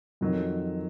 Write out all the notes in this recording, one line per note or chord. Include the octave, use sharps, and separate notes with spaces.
F2 D#3 F#3